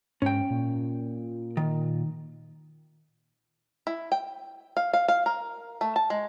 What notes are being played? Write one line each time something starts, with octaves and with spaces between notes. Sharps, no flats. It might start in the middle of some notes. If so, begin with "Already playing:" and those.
G#2 C#4 G5
A#2
D#3
E4
G5
F5
F5
F5
A#4
A3
A5
G#3